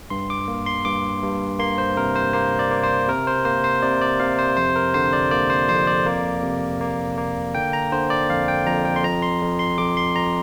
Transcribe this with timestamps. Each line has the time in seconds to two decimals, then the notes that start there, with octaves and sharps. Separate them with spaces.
0.10 G2 C6
0.30 D6
0.48 A#3
0.66 C6
0.85 G2 D6
1.22 G2
1.59 A#3 C6
1.78 C5
1.97 C3 A#4
2.16 C5
2.34 A#3 C5
2.59 D5
2.71 A#3
2.84 C5
3.08 C3 A#4
3.27 C5
3.45 A#3 C5
3.64 C5
3.82 C3 D5
4.01 D5
4.20 C3 F5
4.39 C5
4.57 F2 C5
4.76 A#4
4.94 D3 C5
5.13 D5
5.31 A#3 D5
5.50 C5
5.69 F2 C5
5.87 D5
6.06 A#3
6.43 C3
6.81 A#3
7.17 A#3
7.55 D3 G5
7.73 A#5
7.92 D3 C5
8.10 D5
8.30 F2 F5
8.48 G5
8.66 F2 A#5
8.85 G5
8.96 C6
9.03 F2 A#5
9.22 C6
9.41 F2
9.59 C6
9.78 F2 D6
9.97 C6
10.16 F2 A#5